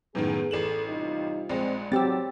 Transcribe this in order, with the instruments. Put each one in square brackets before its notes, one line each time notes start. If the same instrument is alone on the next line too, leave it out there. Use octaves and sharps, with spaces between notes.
[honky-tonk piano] F#2 A2 D#3 [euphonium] B3 [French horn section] G#4 B4
[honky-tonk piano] A1 E7 F#7 [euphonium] A4
[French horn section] C3 G3 F4 [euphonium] D#4
[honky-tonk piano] A#1 G#3 [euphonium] C4
[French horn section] E2 G#2 [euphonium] F#3 [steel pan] C4 G4 [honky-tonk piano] E6 A6